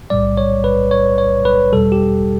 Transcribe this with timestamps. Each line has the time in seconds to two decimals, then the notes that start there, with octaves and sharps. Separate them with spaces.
0.10 B1 A2 G3 D5
0.37 C#5
0.64 B4
0.91 C#5
1.18 C#5
1.45 B4
1.73 E2 B2 G3 A4
1.92 G4